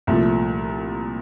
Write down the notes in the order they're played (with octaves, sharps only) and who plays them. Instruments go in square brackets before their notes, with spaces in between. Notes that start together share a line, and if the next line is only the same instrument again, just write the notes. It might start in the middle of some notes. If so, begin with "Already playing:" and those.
[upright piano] C2 A#2 F3 A3